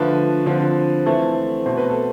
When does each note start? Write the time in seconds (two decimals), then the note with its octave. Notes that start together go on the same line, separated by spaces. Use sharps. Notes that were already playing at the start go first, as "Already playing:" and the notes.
Already playing: D3 F3 A3 B4
0.46 D3 F3 C4
1.06 E3 A3 C4 A4
1.66 B2 A3 C4 C5
1.77 B4
1.90 A4